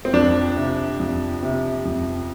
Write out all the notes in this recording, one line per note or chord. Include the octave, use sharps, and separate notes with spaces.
C4
F2 D4
C3
F2
C3
F2